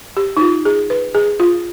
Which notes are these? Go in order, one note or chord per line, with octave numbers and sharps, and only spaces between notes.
G4
D#4
F4
G#4
B4
G#4
F4